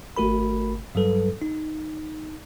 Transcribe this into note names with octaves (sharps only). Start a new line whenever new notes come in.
G#1 A3 F#4 A#4 B5
G2 F#3 G3 A4 B4
D#4